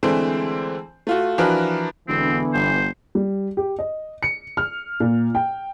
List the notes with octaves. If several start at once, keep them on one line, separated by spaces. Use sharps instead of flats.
D3 E3 G#3 A3 C4 C5
A3 F4 F#4
E3 F3 D4 F#4 A#4 B4
E1 D3 E3 B3 C4
G1 C5
G3
G4
D#5
C#7
F6
A#2
G5